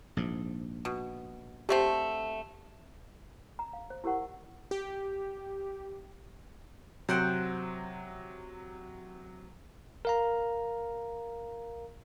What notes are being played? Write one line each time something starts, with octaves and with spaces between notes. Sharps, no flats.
A#1 G#2
B2
D3 A3 C4 G4
A#5
F5
C5
E4 G4 A#4 C5 F#5 C#6
G4
C3 F#3 C5 F#5 G5
A#4 F5 A#5